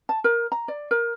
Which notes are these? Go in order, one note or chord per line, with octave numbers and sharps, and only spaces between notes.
A5
A#4
A#5
D5
A#4